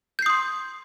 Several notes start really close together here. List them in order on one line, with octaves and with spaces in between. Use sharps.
G6 C7 D#6 C6